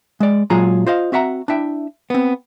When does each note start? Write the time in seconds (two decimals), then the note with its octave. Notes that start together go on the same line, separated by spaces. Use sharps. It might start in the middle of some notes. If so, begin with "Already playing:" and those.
0.20 G#3 D5
0.50 A#2 F#3 G#3 F4 G#4 A#5
0.87 F4 C5 D#5 F5
1.12 C4 F#4 E5 F#5 A#5
1.48 D4 E4 E5 G5
2.10 B3 C4